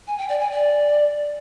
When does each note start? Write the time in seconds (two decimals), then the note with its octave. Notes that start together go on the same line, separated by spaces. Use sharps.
0.07 G#5
0.18 G5
0.29 D5
0.40 G#5
0.51 D5